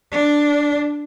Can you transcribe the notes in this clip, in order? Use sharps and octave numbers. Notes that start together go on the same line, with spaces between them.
D4